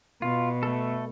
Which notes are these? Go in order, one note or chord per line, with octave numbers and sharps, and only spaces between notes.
B2 F4
A3 A4